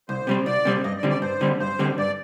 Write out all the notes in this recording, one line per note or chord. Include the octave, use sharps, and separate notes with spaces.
C2 C5
C3 G3 C4
C2 D5
C3 G3 C4
G2 D#5
D5
D3 G3 C4
D5
G2 C5
D3 G3 C4
G2 C5
D3 G3 C4
G2 D5